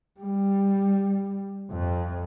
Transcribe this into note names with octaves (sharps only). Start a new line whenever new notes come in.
G3
F2